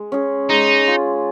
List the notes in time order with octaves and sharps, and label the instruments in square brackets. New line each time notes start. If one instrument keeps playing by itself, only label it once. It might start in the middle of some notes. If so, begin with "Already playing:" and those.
Already playing: [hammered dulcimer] G#3
C#4 G#4
[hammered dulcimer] G#3 [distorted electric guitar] D#4
[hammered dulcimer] F4 G#4